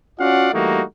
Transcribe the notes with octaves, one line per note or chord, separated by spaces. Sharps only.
C#4 F4 F#4 D5 F5 F#5
E3 G3 A3 A#3 D#4 F#4